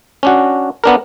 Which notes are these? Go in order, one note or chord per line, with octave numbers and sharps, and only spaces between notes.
C#4 D4 F#4
B3 D4 A#4